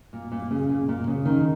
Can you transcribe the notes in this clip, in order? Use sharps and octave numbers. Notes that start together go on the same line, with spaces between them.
A#2
A#2
C#3
A#2
A#2
C#3
D#3